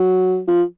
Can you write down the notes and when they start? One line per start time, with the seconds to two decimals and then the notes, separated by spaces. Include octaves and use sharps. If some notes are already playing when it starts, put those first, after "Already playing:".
Already playing: F#3
0.48 F3